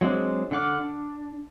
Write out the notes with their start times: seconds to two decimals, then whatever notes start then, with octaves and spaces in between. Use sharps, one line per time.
0.01 F#3 G#3 C4 D4
0.51 D3 D4 F#5 D6 F6
0.81 D4